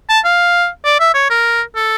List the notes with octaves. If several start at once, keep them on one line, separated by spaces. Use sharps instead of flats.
A5
F5
D5
E5
C#5
A#4
A4